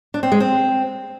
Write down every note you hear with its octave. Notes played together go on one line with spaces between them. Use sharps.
D4
C4
G#3
C4